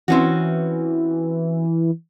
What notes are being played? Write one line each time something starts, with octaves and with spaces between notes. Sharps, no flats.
E3 C4 C#4 F#4